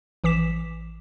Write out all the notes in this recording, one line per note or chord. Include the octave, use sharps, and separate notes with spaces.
A1 E3 D6 B6 E7